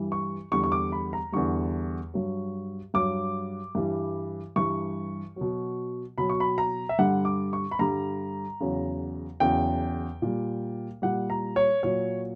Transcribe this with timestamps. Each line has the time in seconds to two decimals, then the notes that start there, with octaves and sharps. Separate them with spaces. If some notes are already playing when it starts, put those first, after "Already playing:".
Already playing: G2 E3 G3
0.12 C#6
0.51 E2 D3 G3 C#6
0.64 C#6
0.72 D6
0.92 B5
1.13 A#5
1.32 E2 D3 G3 C#6
2.14 G2 F#3
2.94 G2 F#3 D6
3.75 G2 E3 G3
4.56 G2 E3 G3 C#6
5.36 B2 F#3
6.18 B2 F#3 B5
6.29 C#6
6.40 B5
6.58 A#5
6.89 E5
6.98 G2 D3 G3 F#5
7.25 D6
7.53 C#6
7.71 B5
7.79 G2 D3 G3 A#5
8.60 E2 C#3 F#3
9.40 E2 C#3 F#3 G5
10.22 A#2 G3
11.02 A#2 G3 F#5
11.30 A#5
11.56 C#5
11.83 A#2 F#3 C#5